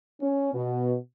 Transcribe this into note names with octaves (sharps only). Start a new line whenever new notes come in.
C#4
B2